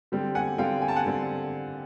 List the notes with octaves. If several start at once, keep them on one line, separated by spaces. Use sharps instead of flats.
D3 G3 C4
F#5 G#5
D3 G3 C4 F5 G5
G#5
A5
F#5 G#5
D3 G3 C4